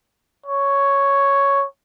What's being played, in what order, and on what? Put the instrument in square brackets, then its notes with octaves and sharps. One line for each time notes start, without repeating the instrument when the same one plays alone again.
[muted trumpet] C#5